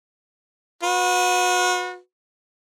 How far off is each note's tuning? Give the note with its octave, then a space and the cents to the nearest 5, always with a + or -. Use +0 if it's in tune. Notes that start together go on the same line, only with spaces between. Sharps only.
F#4 -35 B4 +0